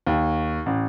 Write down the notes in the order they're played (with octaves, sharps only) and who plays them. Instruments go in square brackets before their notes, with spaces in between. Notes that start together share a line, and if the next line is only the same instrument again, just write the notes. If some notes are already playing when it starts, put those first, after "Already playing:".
[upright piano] D#2
A1